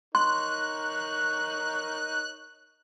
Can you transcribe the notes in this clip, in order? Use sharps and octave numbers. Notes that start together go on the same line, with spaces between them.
D#4 A#4 C#5 C6 F#6